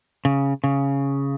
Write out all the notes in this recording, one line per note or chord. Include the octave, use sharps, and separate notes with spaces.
C#3
C#3